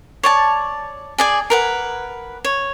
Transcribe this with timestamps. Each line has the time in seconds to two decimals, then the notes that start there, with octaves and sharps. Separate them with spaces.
0.23 C#5 D5 A5
1.18 G#4 D5 G#5
1.50 A#4 B4 F#5
2.45 C#5